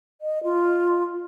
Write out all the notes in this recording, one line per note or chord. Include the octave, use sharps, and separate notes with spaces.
D#5
F4